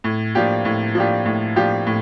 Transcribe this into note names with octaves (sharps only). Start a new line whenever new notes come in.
A2
F3 A#3 D4 G4
A2
F3 A#3 D4 G4
A2
F3 A#3 D4 G4
A2